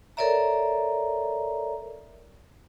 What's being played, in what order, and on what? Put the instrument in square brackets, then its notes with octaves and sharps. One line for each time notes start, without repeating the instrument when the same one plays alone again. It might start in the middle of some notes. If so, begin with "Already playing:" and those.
[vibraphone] A4 A#4 C#5 D5 E5 A#5